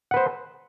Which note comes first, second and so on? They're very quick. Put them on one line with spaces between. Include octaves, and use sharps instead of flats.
F#5 B4 C5